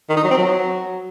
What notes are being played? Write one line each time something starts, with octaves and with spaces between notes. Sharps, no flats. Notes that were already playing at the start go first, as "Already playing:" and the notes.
D#3
D#4
F#3
C4
F#3